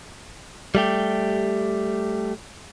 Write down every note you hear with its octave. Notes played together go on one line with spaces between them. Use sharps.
G3 A3 G4